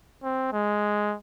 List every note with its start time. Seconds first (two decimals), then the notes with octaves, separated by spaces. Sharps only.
0.23 C4
0.52 G#3